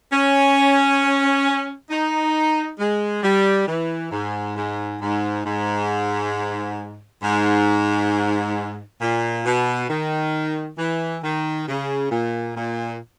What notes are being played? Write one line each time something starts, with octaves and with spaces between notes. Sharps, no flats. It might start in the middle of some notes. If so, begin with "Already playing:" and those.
C#4
D#4
G#3
G3
E3
G#2
G#2
G#2
G#2
G#2
A#2
B2
D#3
E3
D#3
C#3
A#2
A#2